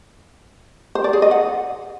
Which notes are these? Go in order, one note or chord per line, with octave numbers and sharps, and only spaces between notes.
C5
D5
G#4
D#5
F#5